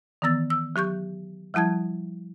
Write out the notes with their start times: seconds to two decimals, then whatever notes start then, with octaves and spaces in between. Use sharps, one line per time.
0.22 D#3 E3 B3 E6 A6
0.50 E6
0.76 F#3 G4 C#6 G6
1.54 F3 G3 E4 A5 G#6